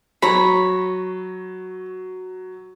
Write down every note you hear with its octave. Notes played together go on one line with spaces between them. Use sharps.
F#3 C#5 A#5 B5